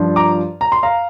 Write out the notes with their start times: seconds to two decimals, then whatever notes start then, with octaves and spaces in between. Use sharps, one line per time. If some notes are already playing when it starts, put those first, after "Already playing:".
Already playing: G2 F3 D4 F4
0.16 A#5 D6
0.61 A#5
0.72 C6
0.83 F5 A#5